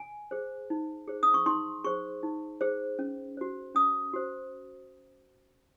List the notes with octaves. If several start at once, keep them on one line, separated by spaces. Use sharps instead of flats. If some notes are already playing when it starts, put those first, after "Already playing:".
Already playing: G#5
G#4 C5
D#4
G#4 C5
D#6
C#6
D#4 C6
G#4 C5 C#6
D#4
G#4 C5
C#4
F#4 C5
C#4 D#6
F#4 C5